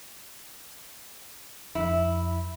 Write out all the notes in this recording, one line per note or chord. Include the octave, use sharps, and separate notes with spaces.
F2 E4